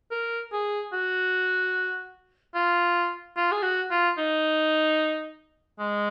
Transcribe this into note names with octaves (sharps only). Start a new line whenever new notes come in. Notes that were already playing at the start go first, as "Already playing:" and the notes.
A#4
G#4
F#4
F4
F4
G#4
F#4
F4
D#4
G#3